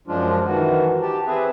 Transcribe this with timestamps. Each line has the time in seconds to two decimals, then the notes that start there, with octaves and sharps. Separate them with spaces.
0.08 F#2 F3 G#3 D4 F4
0.45 D#3 E3 F#4
1.02 G4 A5
1.27 C4 G#4 B4 E5